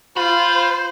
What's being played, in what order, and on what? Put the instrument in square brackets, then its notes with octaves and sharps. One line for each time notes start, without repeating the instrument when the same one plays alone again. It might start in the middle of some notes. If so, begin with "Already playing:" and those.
[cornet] F4 [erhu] C5 [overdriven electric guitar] B5